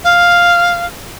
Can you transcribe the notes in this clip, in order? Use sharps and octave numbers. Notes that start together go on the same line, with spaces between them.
F5